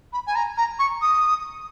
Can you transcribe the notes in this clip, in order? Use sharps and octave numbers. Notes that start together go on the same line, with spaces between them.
B5
G#5
A#5
A#5
C#6
D#6